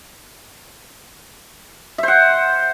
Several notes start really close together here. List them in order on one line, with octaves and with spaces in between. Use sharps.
E5 C5 F#5